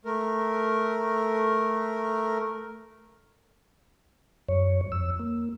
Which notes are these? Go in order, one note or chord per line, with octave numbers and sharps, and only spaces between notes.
A3 A#4
F#2 C#5
F2 E6
A#3